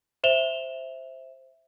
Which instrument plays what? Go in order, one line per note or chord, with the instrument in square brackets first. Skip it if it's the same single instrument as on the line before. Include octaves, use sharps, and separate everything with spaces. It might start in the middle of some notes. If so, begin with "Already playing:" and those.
[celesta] C5 E5 E7 F7 G7